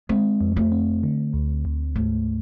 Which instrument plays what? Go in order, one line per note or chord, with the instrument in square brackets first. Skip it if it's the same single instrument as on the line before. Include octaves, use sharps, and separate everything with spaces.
[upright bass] G#3 [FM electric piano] C4
[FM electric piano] F2
[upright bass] A3
[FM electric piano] C4
D3
D2
D2
[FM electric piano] G#2 [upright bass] A3